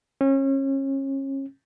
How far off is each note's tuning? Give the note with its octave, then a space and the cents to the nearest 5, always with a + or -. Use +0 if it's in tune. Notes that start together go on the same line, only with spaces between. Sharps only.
C#4 -30